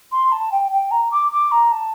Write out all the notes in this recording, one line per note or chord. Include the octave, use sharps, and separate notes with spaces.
C6
A5
G5
G5
A#5
D6
D6
A#5
A5